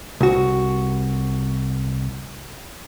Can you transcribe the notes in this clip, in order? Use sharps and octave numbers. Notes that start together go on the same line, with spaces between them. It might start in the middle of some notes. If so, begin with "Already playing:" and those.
C2 F#4